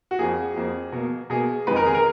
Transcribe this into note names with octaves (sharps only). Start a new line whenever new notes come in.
F#4
F2 F3 A#3 G#4
F2 F3 A#3
B2 A#3
B2 A#3 G#4
F2 D#3 G#3 B4
A#4
G#4
A#4